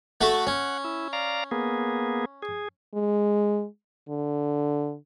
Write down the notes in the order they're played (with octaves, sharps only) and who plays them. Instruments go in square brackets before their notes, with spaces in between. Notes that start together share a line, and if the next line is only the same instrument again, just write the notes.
[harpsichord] A3 F#4 E5 [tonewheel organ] F#5
[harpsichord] C#4
[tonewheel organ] E4
D5 F5 A#5
A#3 B3 G#4
G#4
[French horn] G#3
D3